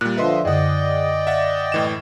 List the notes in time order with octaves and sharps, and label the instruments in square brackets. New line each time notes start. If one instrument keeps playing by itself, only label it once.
[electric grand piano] A#2 G3 [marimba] F#6
[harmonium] D3 F3 E5 [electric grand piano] B4 D#5 C6
[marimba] F#2 D3 [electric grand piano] G#4 F#5 [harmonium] D5 D#5 G5
[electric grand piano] E5 F#5 A6
A2 E3 E7